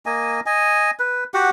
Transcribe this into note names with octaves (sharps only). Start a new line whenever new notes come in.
A#3 D#5 G#5
D#5 G#5
B4
F#4 G4 F#5